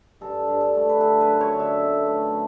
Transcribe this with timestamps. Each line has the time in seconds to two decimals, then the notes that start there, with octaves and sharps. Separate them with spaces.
0.21 G2 A4
0.48 G2
0.61 A4
0.74 A3
0.89 B4
1.00 D3 A4
1.21 B4
1.27 F#2
1.41 C#5
1.53 D3
1.60 E5
1.80 B2
2.06 A3